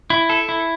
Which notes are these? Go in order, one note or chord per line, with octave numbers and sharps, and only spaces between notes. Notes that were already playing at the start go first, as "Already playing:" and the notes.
E4
A4
E4